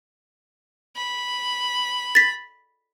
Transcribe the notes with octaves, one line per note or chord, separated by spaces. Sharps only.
B5
A6 B6